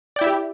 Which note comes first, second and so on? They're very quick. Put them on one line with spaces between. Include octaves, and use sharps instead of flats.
D5 G5 E4 E5 G4